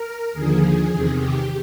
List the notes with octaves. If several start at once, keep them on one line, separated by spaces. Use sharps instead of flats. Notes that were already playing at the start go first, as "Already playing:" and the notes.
Already playing: A#4
D#2 D3 F3 G#4
G#4
E2 C3 D#3
G4